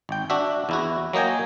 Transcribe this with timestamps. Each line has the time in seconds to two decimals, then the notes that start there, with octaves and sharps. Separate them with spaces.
0.09 G#1 G5
0.30 D4 F#4 E5
0.69 E2 E4 F#4
1.13 F#3 A#3 D#5 G5 G#5